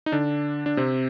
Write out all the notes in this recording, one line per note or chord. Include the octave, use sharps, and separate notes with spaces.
D#4
D3 D4
D4
C3 C4